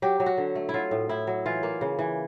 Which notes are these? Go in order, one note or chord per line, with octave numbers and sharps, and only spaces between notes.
F#3 G4
F#3
F#4
D3
A3
E4
F#3 F4
A2
A2 E4
F#3
E3 F4
A#3
C#3
E3